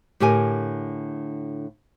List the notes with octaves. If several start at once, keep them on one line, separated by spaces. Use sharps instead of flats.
A2 D3 G4 A#4 G#5